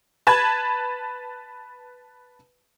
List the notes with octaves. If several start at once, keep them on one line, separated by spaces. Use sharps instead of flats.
B4 A5 B5 G#6